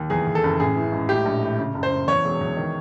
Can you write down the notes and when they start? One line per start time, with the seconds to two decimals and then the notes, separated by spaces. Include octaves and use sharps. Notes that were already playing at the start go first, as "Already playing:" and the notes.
Already playing: D#2
0.10 E2 G#4
0.27 E2
0.35 A4
0.43 F#1
0.60 A1 G#4
0.76 E3
0.92 G#2
1.09 A2 G4
1.25 A#1
1.42 A2
1.58 C#3
1.74 F#1
1.83 C5
1.91 F#1
2.08 E2 C#5
2.25 E1
2.41 E2
2.57 D#3